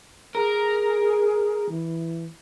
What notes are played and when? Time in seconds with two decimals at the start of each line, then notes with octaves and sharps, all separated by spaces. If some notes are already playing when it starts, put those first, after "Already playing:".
0.35 G#4 A#4
1.69 E3